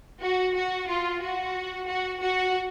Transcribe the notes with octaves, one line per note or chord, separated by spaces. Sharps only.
F#4
F#4
F4
F#4
F#4
F#4